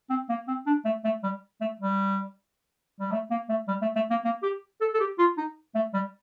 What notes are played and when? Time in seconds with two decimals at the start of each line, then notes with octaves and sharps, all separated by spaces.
0.10 C4
0.29 A#3
0.48 C4
0.66 D4
0.85 A3
1.04 A3
1.23 G3
1.61 A3
1.80 G3
3.00 G3
3.12 A3
3.31 A#3
3.49 A3
3.68 G3
3.82 A3
3.96 A3
4.10 A#3
4.25 A#3
4.43 G4
4.81 A4
4.94 A4
5.00 G4
5.18 F4
5.37 D#4
5.75 A3
5.94 G3